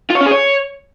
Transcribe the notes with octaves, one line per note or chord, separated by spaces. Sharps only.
F4
C#5
C#4
G#4
C#5